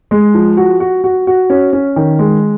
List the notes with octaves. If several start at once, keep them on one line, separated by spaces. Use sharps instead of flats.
G#3
F3
F#4
F#4
F#4
F#4
C#4
C#4
D#3
G#3